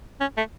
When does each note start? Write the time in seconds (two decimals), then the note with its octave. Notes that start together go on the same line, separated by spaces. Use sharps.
0.21 C#4
0.37 A3